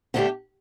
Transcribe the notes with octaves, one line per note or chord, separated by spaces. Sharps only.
D3 A3 D4 G4